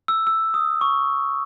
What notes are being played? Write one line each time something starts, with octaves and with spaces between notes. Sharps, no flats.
E6
E6
D#6
C#6